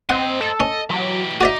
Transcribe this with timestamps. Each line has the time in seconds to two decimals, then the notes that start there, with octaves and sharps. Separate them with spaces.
0.10 C4 C5 D#5 F#5
0.41 A4
0.60 C#4 D#5
0.90 E3 F#3 G4
1.41 D#4 F#4 D5 E5 D6